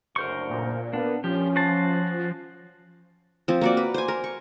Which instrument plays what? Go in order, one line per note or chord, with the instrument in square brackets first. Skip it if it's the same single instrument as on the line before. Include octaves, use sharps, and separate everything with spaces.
[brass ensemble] F#1 D2 [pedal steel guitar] A#4 C5 C#6
[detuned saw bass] A#2
[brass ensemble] A#3 B3 [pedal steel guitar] D4
[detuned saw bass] F3 [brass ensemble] C#4 [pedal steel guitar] G4
[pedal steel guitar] F#4 C5 A5
[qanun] F3 C4
A#3 F#4 D5
B4
C5 G#5
A#4
C#6